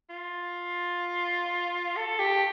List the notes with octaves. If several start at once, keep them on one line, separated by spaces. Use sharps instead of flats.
F4
A4
G4